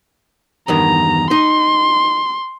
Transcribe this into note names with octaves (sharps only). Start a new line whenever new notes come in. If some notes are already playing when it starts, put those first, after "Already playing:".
E2 G2 D#3 A#5
D#4 C6